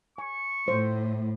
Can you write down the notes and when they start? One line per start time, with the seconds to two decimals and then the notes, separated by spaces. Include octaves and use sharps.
0.18 G#5 C#6
0.68 A2 C5